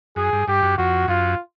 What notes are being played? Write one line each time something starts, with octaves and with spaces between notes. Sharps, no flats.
F#2 G#4
G2
G2 G4
F#2
F2 F#4
F#2 F4